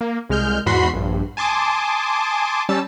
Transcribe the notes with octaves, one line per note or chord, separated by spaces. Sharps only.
A#3
C2 G#3 F6 G6
E2 G#2 F#4 B5 C6 C7
A#1 G2
G#5 A5 C6 D6 D#6
G3 C#4 A5 E6